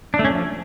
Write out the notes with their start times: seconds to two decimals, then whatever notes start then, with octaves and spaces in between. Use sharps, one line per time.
0.14 D4
0.19 A3
0.25 C#4
0.30 F3